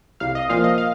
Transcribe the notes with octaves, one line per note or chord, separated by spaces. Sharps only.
C2 F5
D#5
A#2 F3 F5
D#5
F5